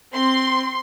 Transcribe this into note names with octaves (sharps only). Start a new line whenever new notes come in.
C4 C6